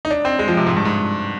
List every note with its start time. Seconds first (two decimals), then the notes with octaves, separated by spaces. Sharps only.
0.05 D#4
0.10 D4
0.25 C4
0.39 G#3
0.48 F3
0.57 C3
0.67 G#2
0.77 G2
0.85 G#2